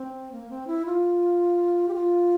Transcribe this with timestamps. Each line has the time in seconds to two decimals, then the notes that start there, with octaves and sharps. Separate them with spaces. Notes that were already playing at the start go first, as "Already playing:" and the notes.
Already playing: C4
0.32 A#3
0.50 C4
0.67 E4
0.86 F4
1.88 G4
1.94 F4